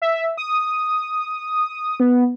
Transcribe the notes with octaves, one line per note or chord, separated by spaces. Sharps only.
E5
D#6
B3